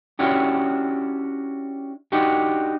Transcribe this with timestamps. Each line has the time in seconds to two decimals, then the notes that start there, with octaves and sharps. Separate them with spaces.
0.19 C#4 D4 E4 F#4 G4
2.12 D4 D#4 F#4 G4